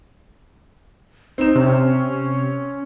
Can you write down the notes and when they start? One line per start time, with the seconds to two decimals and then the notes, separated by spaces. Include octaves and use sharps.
1.38 C4 D#4 E7
1.55 C3 C#4